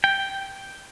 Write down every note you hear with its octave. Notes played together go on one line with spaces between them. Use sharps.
G5